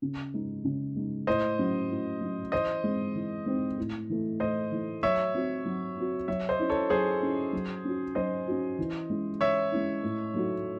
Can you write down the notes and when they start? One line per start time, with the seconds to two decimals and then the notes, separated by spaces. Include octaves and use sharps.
0.02 C#3
0.34 G#3 D#4
0.64 C#3
0.96 G#3 D#4
1.27 A2 C5 D#5
1.59 F#3 C#4
1.90 A2
2.21 F#3 C#4
2.52 E3 C5 D#5
2.84 G#3 C4
3.15 E3
3.46 G#3 C4
3.78 A2
4.09 E3 A3
4.40 A2 C5 D#5
4.72 E3 A3
5.03 F#3 C#5 E5
5.34 C4 F#4
5.65 F#3
5.97 C4 F#4
6.28 F#3 C#5 E5
6.49 C5 D#5
6.59 C#4 E4
6.70 A4 C#5
6.90 F#3 G#4 C5
7.22 C#4 E4
7.53 F#3
7.85 C#4 F#4
8.15 F#3 C5 D#5
8.47 C#4 F#4
8.79 E3
9.10 G#3 C#4 E4
9.41 E3 C#5 E5
9.72 G#3 C#4 E4
10.03 A2
10.34 F#3 A3 D#4 F#4